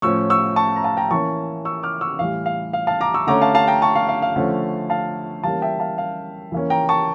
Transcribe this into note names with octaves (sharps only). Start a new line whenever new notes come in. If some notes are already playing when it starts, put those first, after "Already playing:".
A2 F3 C#4 C#6 E6
C#6 E6
A5 C#6
A#5
F5 A5
G5 A#5
E3 A#3 C#4 A5 C#6
C#6 E6
D6 F6
C#6 E6
A2 E3 G3 F5
F5
F5
F5 A5
A#5 D6
C#6 E6
D3 A3 C#4 A#5 D6
F5 A5
F5 A5
G5 A#5
A5 C#6
F5
F5
F5
D3 F3 A3 C#4
F5 A5
E3 G3 A#3 C#4 F5 A5
E5 G5
F5 A5
F5
E3 A#3 C#4
G5 A#5
A5 C#6